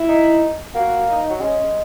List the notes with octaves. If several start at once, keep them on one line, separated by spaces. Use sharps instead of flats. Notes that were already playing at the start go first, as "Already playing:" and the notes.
Already playing: E4
D#4
A#3 F#4
D#4
F#3
G#3 C#4